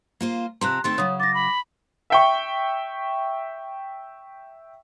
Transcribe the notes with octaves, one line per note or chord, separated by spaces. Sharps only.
A#3 F4 C5
C3 F3 C4 A#5 C6 F#6
D#3 A3 C4 C6 A6
C#3 F#3 C#5 D#6
D6 A6 A#6
B5
E5 G5 C#6